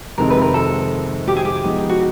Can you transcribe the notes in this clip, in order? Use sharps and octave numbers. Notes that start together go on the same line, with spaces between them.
F2 C3 D#3 G#3 C4 A#4
B4
A#4
A4
G4
G#4
G4
F3 G#3 B3 D#4
F#4